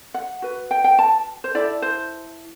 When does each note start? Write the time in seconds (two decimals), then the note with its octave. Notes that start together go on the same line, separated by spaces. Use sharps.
0.14 F#5
0.42 F#4 B4
0.71 G5
0.84 G5
0.99 A5
1.44 C5
1.55 E4 A4 D5
1.82 C5